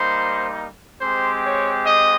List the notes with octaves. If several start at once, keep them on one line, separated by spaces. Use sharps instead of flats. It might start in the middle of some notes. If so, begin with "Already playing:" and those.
Already playing: G3 A#3 D#4 C5
G#3 C4 G4 C5
C#5
D#5